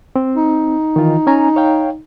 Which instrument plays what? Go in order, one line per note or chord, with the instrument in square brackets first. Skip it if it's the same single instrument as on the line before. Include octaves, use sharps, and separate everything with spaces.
[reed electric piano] C4
[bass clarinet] D#4
[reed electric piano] D#3 E3 F4
C#4 G#5 A#5
C#5 F5 G5